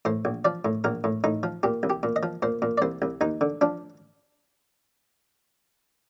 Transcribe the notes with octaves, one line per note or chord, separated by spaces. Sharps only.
A2 C5
A#1
F3 D5
A2
A#1 A#4
A2
A2 D#4
F3
A#2 G4
C2
G4
A#2
D#5
F3
A#2 C5
A#2
D5
C2 C5
C2
D#2 D#4
D3
F3 D4